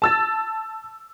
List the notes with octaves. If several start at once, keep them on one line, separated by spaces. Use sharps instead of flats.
A5 E6 A6